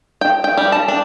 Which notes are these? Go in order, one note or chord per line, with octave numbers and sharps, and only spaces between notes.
G5
G5
G3
A5
D4